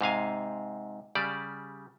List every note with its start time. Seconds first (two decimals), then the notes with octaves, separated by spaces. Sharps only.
0.01 G#2 C3 F5 G#5
1.15 C#3 G3 D5